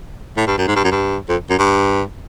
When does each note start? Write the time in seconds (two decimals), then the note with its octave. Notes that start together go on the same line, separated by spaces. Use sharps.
0.37 A2
0.47 G2
0.58 F#2
0.67 G#2
0.76 G2
0.84 F#2
0.91 G2
1.29 F2
1.50 F#2
1.59 G2